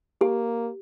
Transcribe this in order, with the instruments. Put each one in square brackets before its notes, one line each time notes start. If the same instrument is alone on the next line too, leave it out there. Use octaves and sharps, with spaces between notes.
[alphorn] A#3 [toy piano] G4